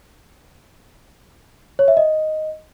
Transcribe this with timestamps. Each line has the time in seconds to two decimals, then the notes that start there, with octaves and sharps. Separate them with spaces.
1.79 C#5
1.88 E5
1.97 D#5